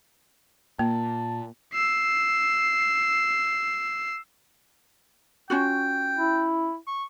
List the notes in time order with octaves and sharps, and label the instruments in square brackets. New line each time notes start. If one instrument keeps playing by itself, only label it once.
[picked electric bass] A#2 [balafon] A#3 [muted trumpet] A5
[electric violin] E6 C7
[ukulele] C#4 F4 F#4 [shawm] G5
[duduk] E4
[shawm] C#6